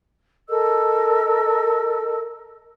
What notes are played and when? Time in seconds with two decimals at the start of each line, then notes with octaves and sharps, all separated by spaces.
0.49 A4 A#4 D#5 E6